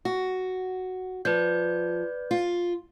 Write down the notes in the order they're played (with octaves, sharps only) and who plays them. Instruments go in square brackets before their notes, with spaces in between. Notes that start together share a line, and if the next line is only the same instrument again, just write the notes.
[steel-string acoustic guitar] F#4
[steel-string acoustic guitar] F3 [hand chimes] B4 D5 G6
[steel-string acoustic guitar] F4